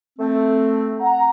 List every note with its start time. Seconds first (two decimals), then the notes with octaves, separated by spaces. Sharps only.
0.19 A3 C4
1.00 F#5 A#5